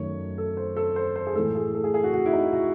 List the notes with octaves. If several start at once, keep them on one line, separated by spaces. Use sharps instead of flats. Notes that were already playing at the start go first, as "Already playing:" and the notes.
Already playing: F#2 D#3 A3 C#5
A4
C5
A4
C5
C5
G#4
A2 E3 G#3 A4
G#4
A4
G#4
G#4
F#4
F#4
E4
D#4
F#4